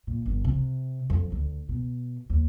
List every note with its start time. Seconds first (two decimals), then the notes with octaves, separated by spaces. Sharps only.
0.07 A#2
0.26 G1
0.44 C3
1.10 F2
1.32 D2
1.69 B2
2.29 D#2